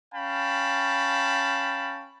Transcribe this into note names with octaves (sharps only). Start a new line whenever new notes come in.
C#4 F5 G5 A5 B5